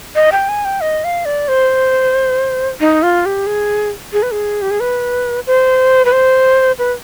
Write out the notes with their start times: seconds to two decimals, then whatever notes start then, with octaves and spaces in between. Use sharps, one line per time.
0.15 D#5
0.32 G5
0.49 G#5
0.65 G5
0.81 D#5
1.04 F5
1.25 D5
1.48 C5
2.80 D#4
3.03 F4
3.26 G4
3.46 G#4
4.13 G#4
4.23 B4
4.32 G#4
4.62 G4
4.71 G#4
4.80 B4
5.47 C5
6.05 B4
6.12 C5
6.79 B4